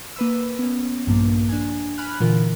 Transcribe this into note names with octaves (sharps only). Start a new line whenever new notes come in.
A#3 B4 E6
B3 C#4
A#1 G2 F3 A#3
D4 G#5
G#5 B5 F6 F#6
A#2 D3 E3 F4 A#4